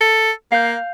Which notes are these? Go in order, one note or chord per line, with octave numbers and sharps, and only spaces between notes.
A4
A#3 F5 G6